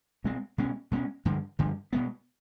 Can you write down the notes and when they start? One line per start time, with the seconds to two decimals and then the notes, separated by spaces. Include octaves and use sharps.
0.24 B2 G#3 C4
0.58 B2 G#3 C#4
0.91 B2 G#3 C#4
1.25 G2 D3 F3
1.59 G2 D3 F3
1.93 B2 G#3 B3